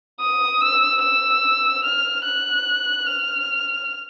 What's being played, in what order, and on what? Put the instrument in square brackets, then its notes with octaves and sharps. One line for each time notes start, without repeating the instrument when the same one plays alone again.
[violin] D#6
E6
E6
F6
F#6
F6